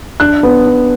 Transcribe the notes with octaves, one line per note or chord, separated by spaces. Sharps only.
D4 F#6
B3
D4